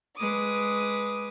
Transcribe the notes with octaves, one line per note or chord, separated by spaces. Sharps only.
G#3 B4 D6 D#6